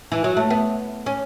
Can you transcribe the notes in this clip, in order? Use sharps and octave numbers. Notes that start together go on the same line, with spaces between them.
E3
F#3
A3
B3
C#4